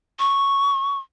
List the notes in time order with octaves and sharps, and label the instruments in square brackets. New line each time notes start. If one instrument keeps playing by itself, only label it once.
[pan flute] C#6